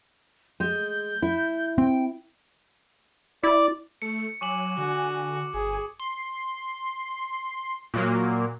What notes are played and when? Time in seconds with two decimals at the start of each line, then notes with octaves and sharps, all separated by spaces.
0.60 G#3 G6
1.22 E4
1.78 C4 G5
3.43 E4 D5
4.02 A3 C#7
4.41 F#3 G#5 C#6 D6 F#7
4.78 D3 F#4
5.54 G1 G#4 G#5
5.99 C6
7.94 A#2 F#3 A#3